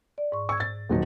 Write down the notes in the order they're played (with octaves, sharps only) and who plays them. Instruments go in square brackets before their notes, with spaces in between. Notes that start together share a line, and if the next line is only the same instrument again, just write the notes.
[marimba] D5
G#2 C#6
[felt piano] C#6 [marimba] E6 G#6
[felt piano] A6
D#1 F#3 D#4